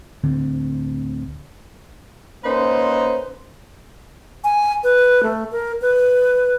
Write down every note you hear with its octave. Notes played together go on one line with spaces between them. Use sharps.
D1 D2 D3 C4
A#3 C#4 D#4 B4 C5
G#5
B4
A3
A#4
B4